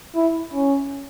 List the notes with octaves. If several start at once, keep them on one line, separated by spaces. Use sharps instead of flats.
E4
C#4